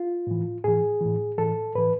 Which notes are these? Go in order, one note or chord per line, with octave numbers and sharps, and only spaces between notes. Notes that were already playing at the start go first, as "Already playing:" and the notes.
Already playing: F4
A2 E3
A2 E3 G#4
A2 E3
A2 E3 A4
A2 E3 B4